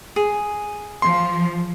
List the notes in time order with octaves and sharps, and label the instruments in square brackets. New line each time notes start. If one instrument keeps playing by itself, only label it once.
[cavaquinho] G#4
[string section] F3 [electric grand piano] C6